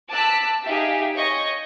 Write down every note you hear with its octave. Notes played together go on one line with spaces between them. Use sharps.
A5 D6 E6 F#6 B6
D#4 G4 G#4 E5 F5
C#5 D#5 C#6 G6